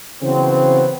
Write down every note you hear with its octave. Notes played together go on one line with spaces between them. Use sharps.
C#3 E3 F#3 B3 C4